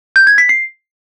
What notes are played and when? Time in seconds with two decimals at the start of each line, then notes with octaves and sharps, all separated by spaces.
0.16 G6
0.27 G#6
0.38 B6
0.49 C7